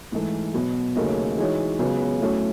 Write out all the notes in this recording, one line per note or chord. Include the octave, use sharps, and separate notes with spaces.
G#2 E3 A3
B2 F#3 B3
D#2 C#3 F#3 A3 D#4
E3 G#3 D#4 F#4 C#5
C#2 C#3 F#3 B3
A2 F#3 A3 C#4